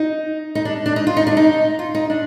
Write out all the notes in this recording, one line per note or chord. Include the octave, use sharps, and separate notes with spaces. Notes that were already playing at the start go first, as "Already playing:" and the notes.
Already playing: D#4
D#4
D4
D4
D#4
F4
D#4
D4
D#4
F4
D#4
D4